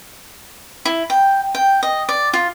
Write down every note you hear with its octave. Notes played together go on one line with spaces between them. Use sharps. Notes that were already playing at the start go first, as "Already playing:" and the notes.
E4
G5
G5
D#5
D5
F4